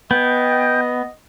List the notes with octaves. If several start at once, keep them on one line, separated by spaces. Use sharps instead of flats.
B3 D#5 G5